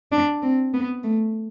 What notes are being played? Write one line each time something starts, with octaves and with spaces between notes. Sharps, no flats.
D4
C4
B3
A3